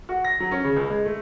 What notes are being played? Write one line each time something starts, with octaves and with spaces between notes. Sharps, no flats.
F#4
A#6
F#3
C#4
C#3
C#2
G#3
A3